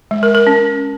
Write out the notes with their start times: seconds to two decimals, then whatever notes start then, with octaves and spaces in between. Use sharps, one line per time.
0.11 G#3
0.23 A#4
0.35 A#4
0.47 C#4